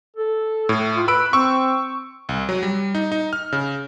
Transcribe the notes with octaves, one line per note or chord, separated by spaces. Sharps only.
A4
A2
F4
B4 B5 E6 D7
C4 C#6 E6
C2
F#3
G3
D#4
D#4
F6
C#3